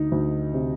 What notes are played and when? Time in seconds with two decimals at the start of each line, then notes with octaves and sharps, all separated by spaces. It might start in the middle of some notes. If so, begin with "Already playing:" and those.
Already playing: D2 D#4
0.12 D2
0.54 C3